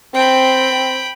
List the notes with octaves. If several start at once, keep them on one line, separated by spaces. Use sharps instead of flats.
C4 G5 B5